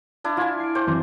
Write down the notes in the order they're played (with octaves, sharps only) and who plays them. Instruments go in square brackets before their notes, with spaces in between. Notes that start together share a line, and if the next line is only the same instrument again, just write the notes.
[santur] D4 E4
[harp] E4 G#6 [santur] F4 G#5
[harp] C7 D7
[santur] C5 [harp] G5 D6
[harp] F#2 E3 C4